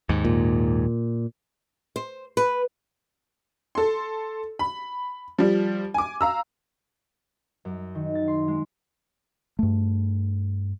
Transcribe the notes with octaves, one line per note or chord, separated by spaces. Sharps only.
D#2 G#2
A#2
C5
B4
A4 C6
B5
F3 G3
G#5 D6
F5 A#5 E6
F#2
D#3
A6
C6
G#3
G2 A3